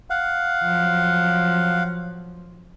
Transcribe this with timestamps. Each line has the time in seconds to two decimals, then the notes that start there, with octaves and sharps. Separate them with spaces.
0.10 F5 F#5
0.64 F3 F#3